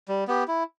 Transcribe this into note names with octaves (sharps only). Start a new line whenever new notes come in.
G3
B3 G4
E4